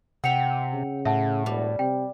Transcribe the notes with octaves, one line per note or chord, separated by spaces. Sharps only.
C3 E5 F#5 G5 C#7 F7
C#3
A2 E5 F#5 A5
E1 G3
C3 G5